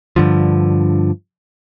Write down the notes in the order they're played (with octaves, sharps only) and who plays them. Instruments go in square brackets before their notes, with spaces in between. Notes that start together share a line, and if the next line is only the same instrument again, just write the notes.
[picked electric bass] G2 D3 F3